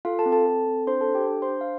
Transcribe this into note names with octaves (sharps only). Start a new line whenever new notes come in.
F4 A4 F5
A4 A5
C4
A4 A5
A4
C4
D4 C5 C6
A4 A5
D4
G4 G5
D4
C5 C6
D4
F5